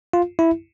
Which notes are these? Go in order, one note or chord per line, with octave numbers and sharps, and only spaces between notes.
F4
E4